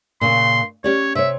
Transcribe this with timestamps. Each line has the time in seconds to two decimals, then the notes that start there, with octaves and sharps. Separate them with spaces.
0.21 A#2 C#3 C6
0.84 C#4 G4 C#5 D5
1.15 C3 C#5 E5